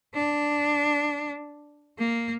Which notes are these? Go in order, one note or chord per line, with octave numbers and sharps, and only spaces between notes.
D4
A#3